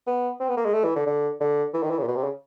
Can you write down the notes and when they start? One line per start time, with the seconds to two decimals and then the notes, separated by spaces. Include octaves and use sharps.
0.07 B3
0.40 C4
0.49 B3
0.57 A#3
0.65 G#3
0.73 A3
0.84 E3
0.96 D3
1.06 D3
1.40 D3
1.74 E3
1.83 D#3
1.90 E3
1.98 C#3
2.03 A#2
2.07 B2
2.16 C3
2.24 C#3